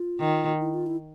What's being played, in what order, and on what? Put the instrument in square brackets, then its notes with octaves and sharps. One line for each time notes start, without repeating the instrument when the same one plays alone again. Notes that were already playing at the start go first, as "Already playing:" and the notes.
Already playing: [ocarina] F4
[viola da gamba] D#3
[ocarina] E4
F4
E4